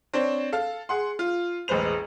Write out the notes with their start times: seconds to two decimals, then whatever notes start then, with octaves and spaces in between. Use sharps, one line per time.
0.13 C4 D4 C5 C#5
0.53 A4 F5
0.89 G#4 F#5 C6
1.19 F4
1.68 E1 A1 G#3 B4 C5 F7